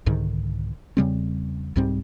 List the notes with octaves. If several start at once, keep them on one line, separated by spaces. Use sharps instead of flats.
C2 G#2 D3 D#3
E2 C#3 G3 C4
C2 G#2 G3 C4